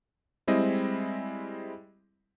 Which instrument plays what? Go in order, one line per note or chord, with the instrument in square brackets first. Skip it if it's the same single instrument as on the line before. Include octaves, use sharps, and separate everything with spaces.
[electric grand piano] G3 G#3 C4 E4 D#5